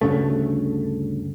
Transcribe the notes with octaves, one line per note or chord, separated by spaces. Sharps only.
D2 G2 C#3 A3